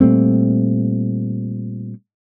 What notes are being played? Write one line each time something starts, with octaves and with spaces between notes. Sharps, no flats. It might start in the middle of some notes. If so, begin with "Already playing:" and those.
A#2 G3 A3 C4